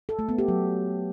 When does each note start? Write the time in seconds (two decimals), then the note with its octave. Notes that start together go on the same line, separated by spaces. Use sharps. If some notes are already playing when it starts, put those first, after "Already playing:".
0.09 A4
0.19 A3
0.29 B3
0.38 G4
0.48 F#3